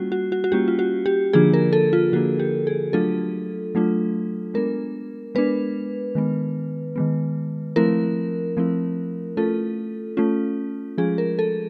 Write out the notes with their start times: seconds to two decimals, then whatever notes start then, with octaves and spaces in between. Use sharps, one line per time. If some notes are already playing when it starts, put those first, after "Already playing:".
Already playing: G3 A#3 C#4 F4 F#4
0.12 F#4
0.32 F#4
0.44 F#4
0.52 G3 A#3 C#4 F4 G4
0.68 F4
0.79 F#4
1.06 G4
1.33 D3 F3 A#3 D4 F4 G#4
1.54 A#4
1.73 A4
1.93 F4
2.13 D3 F3 A#3 D4 F4 F#4
2.40 G4
2.67 G#4
2.93 F#3 A3 D4 F4 A4
3.75 F#3 A3 D4 F4
4.54 G#3 B3 D4 A#4
5.35 G#3 B3 D4 B4
6.15 D#3 G#3 B3
6.96 D#3 G#3 B3
7.76 F3 A3 C4 E4 A#4
8.57 F3 A3 C4 E4
9.37 A3 C#4 F4 A4
10.17 A3 C#4 F4
10.98 F3 G#3 C#4 F4 G#4
11.18 A#4
11.39 A4